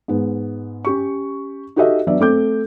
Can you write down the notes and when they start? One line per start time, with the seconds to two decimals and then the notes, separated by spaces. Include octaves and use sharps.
0.08 G#2 B3
0.85 C#4 G4 C#6
1.76 D#4 F#4 G4 A4 D#5 E5
2.07 F#3 B3 D4 D5 E5
2.20 A3 C4 D6 G6